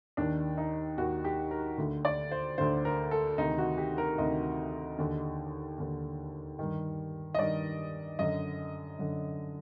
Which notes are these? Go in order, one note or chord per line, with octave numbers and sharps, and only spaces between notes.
D#2 D#3 D4
D#4
D#2 D#3 F#4
G4
A#4
D2 D3
D5
C5
D2 D3 C5
A#4
A4
D2 C3 D#3 D#4
F#4
G4
A#4
D2 C3 D#3 D#5
D#2 D3
D#2 D3
G2 D#3
D#5
G2 D#3 D5
F#2 D3 D#5
F#2 D3